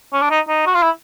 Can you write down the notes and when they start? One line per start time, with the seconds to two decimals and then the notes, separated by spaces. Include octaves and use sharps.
0.13 C#4
0.22 D4
0.30 D#4
0.48 D#4
0.66 F#4
0.74 F4
0.82 E4